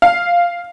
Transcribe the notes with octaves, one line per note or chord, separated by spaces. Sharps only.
F5